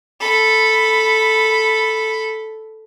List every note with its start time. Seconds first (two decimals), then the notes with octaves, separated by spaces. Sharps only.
0.20 A4 B5